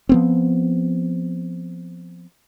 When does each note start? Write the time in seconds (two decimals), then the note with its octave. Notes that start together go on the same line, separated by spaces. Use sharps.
0.09 F3 B3 C4